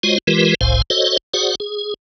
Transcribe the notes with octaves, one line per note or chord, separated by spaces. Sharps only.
G#3 F4 F#4 C5 C#5 D#5
E3 G#3 F4 G4 A#4 B4
F#1 C2 A2 C5 F5 G#5
F#4 A4 C5 C#5 D#5
F#4 G#4 C5 D5 F#5
G#4